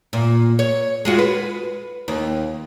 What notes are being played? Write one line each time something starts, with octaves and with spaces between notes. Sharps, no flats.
A#2
C#5
G#3 F4 F#4
B4
D#2